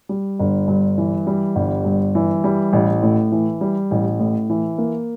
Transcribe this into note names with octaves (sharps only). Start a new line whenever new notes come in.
G3
G1
G2
E3
G3
G1
G2
E3
G3
A1
A2
E3
G3
A1
A2
E3
A#3